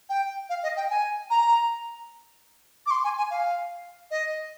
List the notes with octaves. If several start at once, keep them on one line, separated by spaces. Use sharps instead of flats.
G5
F5
D#5
G5
G#5
A#5
D6
C6
G#5
G#5
F5
D#5